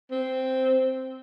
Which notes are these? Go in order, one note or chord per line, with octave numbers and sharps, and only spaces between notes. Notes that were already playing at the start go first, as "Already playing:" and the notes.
C4